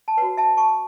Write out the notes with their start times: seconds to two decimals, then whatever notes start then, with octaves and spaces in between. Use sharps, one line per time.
0.08 A5
0.17 F#4 B4 C#5 F#5
0.37 E5 A5
0.57 A5 C#6